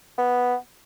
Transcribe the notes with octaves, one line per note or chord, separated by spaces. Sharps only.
B3